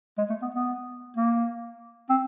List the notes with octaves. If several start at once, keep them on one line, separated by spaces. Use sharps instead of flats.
G#3
A3
B3
B3
A#3
C4